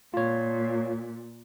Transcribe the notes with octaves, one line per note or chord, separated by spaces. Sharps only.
A#2 F4 C#5